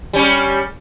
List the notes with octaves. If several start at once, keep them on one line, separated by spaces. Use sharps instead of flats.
G3 C#4